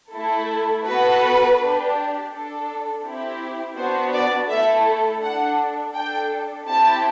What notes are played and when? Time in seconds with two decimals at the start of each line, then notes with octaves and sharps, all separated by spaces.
0.12 A3 E4 A4
0.85 B3 F#4 A4 B4
1.58 D4 G4
2.31 D4 A4
3.04 C4 E4 G4
3.76 B3 D4 F#4 C5
4.13 D5
4.49 A3 E4 A4 E5
5.22 D4 A4 F#5
5.95 D4 A4 G5
6.67 C4 E4 G4 A5